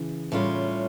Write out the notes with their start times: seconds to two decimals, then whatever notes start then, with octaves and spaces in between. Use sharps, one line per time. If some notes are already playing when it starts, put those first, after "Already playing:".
Already playing: C#3 E3
0.32 A2 G3 C#4 F4